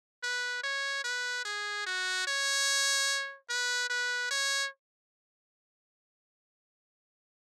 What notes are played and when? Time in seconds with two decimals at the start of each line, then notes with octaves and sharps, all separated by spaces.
0.23 B4
0.64 C#5
1.04 B4
1.45 G#4
1.86 F#4
2.27 C#5
3.49 B4
3.90 B4
4.31 C#5